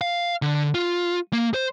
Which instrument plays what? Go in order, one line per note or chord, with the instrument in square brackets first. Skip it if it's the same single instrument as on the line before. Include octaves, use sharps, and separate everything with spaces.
[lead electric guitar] F5
D3
F4
A#3
C5